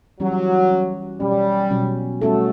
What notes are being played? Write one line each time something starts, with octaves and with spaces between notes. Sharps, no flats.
E3 F#3 G3 C#4 G4
E3 G3 C#4 G4
B2 F#3 G3 C#4
B2 F#3 C#4
G3 A3 C#4 F#4 A4